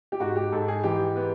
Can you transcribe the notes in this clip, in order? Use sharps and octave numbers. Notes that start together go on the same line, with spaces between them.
G4
G#2 F#4
G4
G#2 A4
G#4
E3 G4
B3